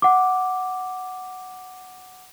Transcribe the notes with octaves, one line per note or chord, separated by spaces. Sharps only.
F#5 D6